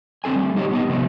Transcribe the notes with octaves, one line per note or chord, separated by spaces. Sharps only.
D3 C4 D4 A4 G#5
G3 A3
G3 D#4 G4 C#5 D#5
B3 G4 D#5
C3 F3 A3 B3